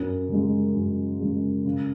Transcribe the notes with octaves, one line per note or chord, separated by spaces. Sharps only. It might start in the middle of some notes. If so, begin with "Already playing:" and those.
Already playing: F#2
C#3 G#3
F#2
C#3 G#3
C#3